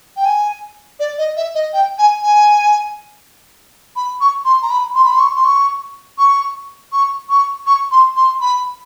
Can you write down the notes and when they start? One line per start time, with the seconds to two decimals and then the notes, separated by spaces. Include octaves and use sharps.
0.17 G5
0.25 G#5
1.00 D5
1.18 D#5
1.37 E5
1.55 D#5
1.73 G5
1.99 G#5
2.23 G#5
3.96 B5
4.21 C#6
4.45 C6
4.62 A#5
4.70 B5
4.95 C6
5.04 B5
5.12 C6
5.20 C#6
5.36 C6
5.45 C#6
6.18 C#6
6.93 C#6
7.30 C#6
7.67 C#6
7.91 C6
8.16 C6
8.41 B5